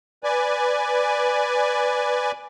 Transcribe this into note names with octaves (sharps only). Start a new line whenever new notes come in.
B4 D5 G#5